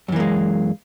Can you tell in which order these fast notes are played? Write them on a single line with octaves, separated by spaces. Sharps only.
F#2 E3 A#3 G#3